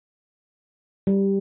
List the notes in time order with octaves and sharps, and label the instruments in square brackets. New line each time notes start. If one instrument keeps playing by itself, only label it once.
[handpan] G3